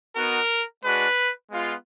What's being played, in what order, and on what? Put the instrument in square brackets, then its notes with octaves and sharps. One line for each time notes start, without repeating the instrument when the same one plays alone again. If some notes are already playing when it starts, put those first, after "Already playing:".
[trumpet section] B3 D#4 F#4 A#4
G#3 D4 F#4 B4
G#3 B3 F4